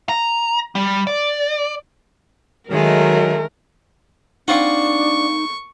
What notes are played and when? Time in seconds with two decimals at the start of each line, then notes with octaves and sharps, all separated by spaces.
0.09 A#5
0.75 G3
1.07 D5
2.70 D#3 F#3 G#3 A3 A#4
4.48 C4 D4 D#4 F4 F#5 C#6